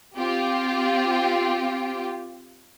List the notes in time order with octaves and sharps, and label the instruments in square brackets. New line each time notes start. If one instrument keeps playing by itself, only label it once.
[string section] C4 F4 G4